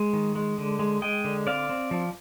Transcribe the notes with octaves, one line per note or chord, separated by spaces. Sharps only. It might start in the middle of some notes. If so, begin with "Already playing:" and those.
Already playing: G#3
D#3
G#3
D3
G#3
G#3 D#5 G5
D3
C4 D5 F5
C4
F3